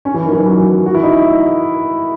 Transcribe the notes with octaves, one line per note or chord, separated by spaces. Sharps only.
C#4
E3
D#3
F#3
E3
F#3
F#4
E4
D#4
E4